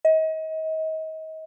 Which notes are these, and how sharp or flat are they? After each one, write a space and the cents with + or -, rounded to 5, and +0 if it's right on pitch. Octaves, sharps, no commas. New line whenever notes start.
D#5 +35